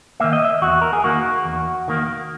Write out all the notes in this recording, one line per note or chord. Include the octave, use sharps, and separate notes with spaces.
D#3 A#3 E5
D#5
E5
E2 F#4
A#4
G#4
D#3 A#3 F#4
E2
D#3 A#3